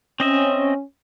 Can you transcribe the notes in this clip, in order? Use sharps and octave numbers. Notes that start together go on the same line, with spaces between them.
C4 C#4 D#5 E5